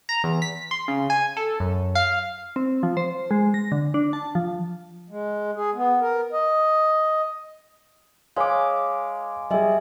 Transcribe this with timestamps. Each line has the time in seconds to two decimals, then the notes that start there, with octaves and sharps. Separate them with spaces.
0.09 A#5
0.24 E2
0.42 B6
0.71 C6
0.88 C#3
1.10 G#5
1.37 A4
1.60 F#2
1.95 F5
2.56 C4
2.83 F3
2.97 C5
3.31 G#3
3.54 A#6
3.72 D3
3.94 D4
4.13 A5
4.35 F3
5.10 G#3
5.55 G#4
5.75 B3
6.00 A#4
6.33 D#5
8.36 G#3 C#5 F5 G#5 D6
9.50 G3 G#4 D#5 E5 G#5